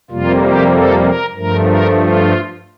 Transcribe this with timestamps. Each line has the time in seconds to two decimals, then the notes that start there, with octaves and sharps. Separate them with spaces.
0.11 F2 C3 G3 A#3 F4
0.42 G4
0.73 A4
1.04 A#4
1.34 G2 F3 A3 A#4
1.65 A#4
1.97 F4